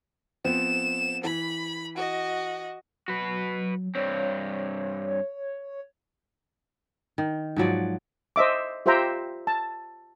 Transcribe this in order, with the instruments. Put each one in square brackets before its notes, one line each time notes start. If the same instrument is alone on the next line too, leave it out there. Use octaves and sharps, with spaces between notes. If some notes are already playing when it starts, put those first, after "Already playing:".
[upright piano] F3 B3 C4 [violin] E7
[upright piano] E3 [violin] B5
[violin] F#4 D#5
[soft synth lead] F#3 [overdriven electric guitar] F#4 B4
[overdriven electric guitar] G2 C4 [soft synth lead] C#5
[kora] D#3
G#2 F3 F#3 D5
[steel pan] C5 D#5 E5 D6
F4 G4 C5 E5 G5 A#5
A5